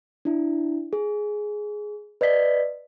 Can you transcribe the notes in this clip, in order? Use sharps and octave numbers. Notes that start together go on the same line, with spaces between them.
D4 E4
G#4
B4 D5 D#5 B6